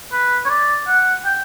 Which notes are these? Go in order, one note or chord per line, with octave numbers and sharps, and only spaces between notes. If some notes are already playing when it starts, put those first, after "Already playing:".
B4
C#5
D5
F#5
G5